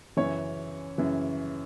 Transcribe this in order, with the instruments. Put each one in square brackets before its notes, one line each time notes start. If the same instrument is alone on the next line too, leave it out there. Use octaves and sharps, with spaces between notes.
[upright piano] F#2 C#3 E3 C#4 C#5
F#2 C#3 E3